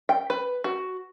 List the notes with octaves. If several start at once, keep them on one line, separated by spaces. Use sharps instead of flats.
G5
B4
F#4